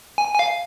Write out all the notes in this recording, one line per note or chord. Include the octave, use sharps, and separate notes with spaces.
G#5
G#5
F5